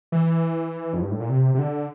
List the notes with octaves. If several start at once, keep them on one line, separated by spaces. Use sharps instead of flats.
E3
F2
G2
A2
A#2
C3
C3
D3